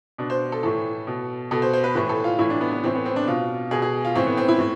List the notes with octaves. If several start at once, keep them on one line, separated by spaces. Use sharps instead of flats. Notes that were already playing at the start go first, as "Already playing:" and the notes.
B2 D4
C5
A4
A2 E3 A4
B2
B2 A4
C5
C5
B4
A2 E3 B4
A4
F4
A2 E3 E4
D4
B3
B3
A2 E3 C4
B3
C4
D4
B2 F4
B2 G#4
G#4
F4
A2 E3 C4
B3
C4
E4
A2